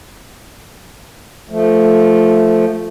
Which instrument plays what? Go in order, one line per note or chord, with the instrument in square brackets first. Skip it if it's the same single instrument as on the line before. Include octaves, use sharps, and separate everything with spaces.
[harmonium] F3 A3